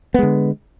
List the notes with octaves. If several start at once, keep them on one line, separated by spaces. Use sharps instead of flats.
D3 G#3 B3